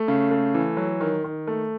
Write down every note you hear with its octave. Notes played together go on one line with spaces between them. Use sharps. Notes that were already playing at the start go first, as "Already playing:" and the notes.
Already playing: A3
C#3
A3
E3
F#3
D#3
D#3
A3